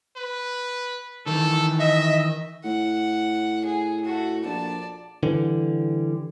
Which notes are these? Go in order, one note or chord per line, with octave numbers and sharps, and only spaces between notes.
B4
D#3 E3 A4
D#5 E5
A2 F#5
G#4
A3 F#4
A#1 D5 A5
D3 E3 G3